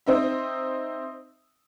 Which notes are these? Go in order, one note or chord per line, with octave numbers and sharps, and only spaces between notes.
C4 D#4 E5